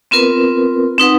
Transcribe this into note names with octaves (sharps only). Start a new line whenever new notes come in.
B3 C4 F4 A#4 B4
C4 D#4 B4 F#5